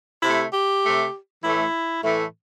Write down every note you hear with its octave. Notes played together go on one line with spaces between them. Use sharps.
C3 A3 E4
G4
C3 A3
A2 E3 A3 E4
A2 E3 A3